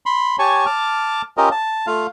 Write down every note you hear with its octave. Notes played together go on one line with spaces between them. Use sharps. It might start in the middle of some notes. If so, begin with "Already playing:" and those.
B5 C6
G4 C#5 G#5 A5 C#6
A5 D6 F6
C#4 F4 G4 A#4 D#5
A5
A3 F4 F5